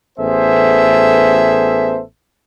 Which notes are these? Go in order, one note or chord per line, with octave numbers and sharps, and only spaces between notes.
A1 B3 G#4 A4 C5 E5